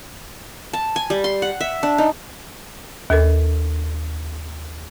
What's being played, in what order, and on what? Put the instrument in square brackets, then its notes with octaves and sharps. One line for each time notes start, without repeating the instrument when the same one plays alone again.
[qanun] A5
G#5
G3
C6
F#5
E5
D4
D#4
[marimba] D#2 A4 A#4